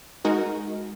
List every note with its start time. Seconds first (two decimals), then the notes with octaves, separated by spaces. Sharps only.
0.25 G#3 D#4 F#4 A#4